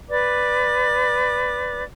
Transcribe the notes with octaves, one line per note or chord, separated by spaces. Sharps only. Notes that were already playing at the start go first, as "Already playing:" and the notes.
B4 D5 D6